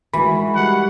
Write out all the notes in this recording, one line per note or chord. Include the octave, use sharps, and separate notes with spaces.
E3 G#3 F#4 A#4 B5
G3 F#4 G4 F#5